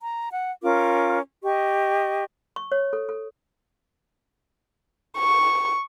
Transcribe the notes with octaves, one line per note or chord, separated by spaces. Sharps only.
A#5
F#5
C#4 F4 A#4 D6
G4 D#5 C#6
C#6
C#5
A4
A4
C#6